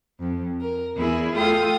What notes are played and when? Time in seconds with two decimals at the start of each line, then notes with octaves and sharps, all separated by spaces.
0.20 F2
0.60 A#4
0.96 E2 E4 G#4
1.35 A3 F4 A4 G5 D#6